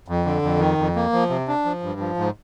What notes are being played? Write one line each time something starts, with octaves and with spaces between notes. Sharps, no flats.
F2
D3
F2
D#3
F2
A#3
F3
C3
D4
F3
G2
F3
G#2